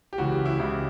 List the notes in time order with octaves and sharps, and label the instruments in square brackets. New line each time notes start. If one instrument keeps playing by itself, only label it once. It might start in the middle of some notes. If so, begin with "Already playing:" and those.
[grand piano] G4
C#2 C#3 E3 F#4
G4
E4
C#2 C#3 E3 E4